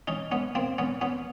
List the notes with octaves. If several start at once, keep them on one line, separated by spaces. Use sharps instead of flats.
C#4 D#4
B3 C#4
A#3 C4
B3 C#4
B3 C#4